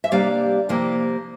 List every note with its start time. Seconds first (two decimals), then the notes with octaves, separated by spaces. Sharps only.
0.04 E5
0.11 C3 G3 A#3 D4 D5 F5
0.69 C3 F3 A#3 E4